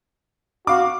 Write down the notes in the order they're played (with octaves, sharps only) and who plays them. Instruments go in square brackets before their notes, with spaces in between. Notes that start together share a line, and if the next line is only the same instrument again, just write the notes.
[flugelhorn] F#4 [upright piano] F5 D6